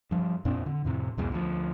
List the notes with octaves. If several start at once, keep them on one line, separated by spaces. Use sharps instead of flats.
G2 F3
F2 A#2 C4 D4
D3
F2 A2 C3
B1 E2 G#2 B2
D2 C3 F3